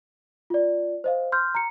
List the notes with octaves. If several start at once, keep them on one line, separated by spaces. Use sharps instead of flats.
F4 D5
C5 D#5 F5
C6 F6 G6
A#5 C#7